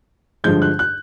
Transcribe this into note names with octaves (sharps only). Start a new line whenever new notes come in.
G2 D3 F3 G#3 G6
F#6
F#6